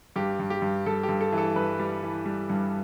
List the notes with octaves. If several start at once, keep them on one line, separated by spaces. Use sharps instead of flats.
G2 G4
G2
G4
G2
G2 A4
G4
G2
A4
E3
A4
G2 B4
G3
E3
G3
G2